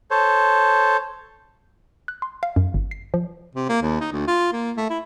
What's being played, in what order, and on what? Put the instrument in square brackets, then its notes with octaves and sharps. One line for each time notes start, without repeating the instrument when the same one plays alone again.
[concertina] A4 C5 C#5
[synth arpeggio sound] F#6
C6
F5
F#2
G1
C7
F3
[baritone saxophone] C3
A#3
D#2
D#4
D2
F4
A#3
A3
E4